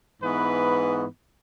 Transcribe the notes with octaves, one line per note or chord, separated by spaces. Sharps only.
G#2 E3 B3 B4